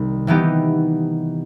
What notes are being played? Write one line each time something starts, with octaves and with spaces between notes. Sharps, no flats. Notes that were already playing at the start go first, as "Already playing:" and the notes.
Already playing: C2 C3 D#3 G3
C3 E3 B3 D#4 G4